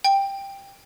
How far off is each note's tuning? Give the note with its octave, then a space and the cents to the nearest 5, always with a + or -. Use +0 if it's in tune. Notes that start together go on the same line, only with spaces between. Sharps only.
G5 +10